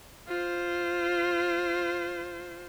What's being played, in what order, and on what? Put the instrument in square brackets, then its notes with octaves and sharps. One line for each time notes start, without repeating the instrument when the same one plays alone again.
[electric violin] F4 C5